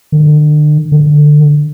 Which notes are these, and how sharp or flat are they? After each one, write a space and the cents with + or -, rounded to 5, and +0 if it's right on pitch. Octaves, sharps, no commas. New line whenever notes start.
D3 +40
D3 +15